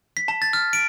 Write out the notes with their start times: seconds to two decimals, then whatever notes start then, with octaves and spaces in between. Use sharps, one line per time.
0.17 B6
0.28 A5
0.42 A6
0.53 F6
0.73 D7